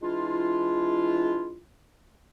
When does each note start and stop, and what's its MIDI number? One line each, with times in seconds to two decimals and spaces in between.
0.02 1.60 52
0.02 1.60 56
0.02 1.60 62
0.02 1.60 64
0.02 1.60 65